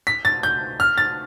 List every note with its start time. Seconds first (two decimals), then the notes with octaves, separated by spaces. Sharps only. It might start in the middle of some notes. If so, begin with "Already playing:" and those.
0.07 B6
0.25 A6
0.43 G6
0.80 F6
0.98 A6